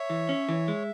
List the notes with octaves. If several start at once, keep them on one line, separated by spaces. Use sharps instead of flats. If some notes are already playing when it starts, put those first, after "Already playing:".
Already playing: C#5 E5
E3
C#4
E3
G#3